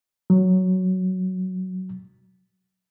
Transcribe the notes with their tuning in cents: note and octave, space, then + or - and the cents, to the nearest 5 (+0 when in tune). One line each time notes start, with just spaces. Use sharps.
F#3 +5